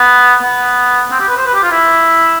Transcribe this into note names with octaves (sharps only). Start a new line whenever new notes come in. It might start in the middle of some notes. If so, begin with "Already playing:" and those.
Already playing: B3
B3
C4
G4
B4
C5
B4
G4
F4
E4